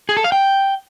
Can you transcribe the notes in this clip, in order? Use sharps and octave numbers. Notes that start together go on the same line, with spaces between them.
G#4
A4
F5
G5